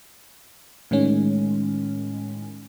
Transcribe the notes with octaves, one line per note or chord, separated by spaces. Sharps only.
A2 D#3 G#3 C#4